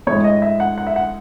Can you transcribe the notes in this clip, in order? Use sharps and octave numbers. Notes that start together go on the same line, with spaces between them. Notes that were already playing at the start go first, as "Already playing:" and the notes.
A2 G#3 C#5
D#5
E5
F#5
F#5
E5
F#5